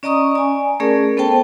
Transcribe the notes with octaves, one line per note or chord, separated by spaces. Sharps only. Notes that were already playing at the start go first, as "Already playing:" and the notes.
C#4 D5 D#5 A#5 C#6 D#6
D5 G#5
A3 C#4 G#4 A#4 D5
B3 A4 C5 G5 A5